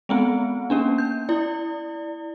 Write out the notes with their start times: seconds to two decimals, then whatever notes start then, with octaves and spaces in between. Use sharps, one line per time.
0.09 G#3 B3 C4
0.70 A#3 C#4 D4
0.98 G6
1.29 E4 D5